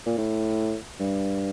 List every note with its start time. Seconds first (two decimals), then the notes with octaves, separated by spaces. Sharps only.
0.06 A#2
0.18 A2
1.00 G2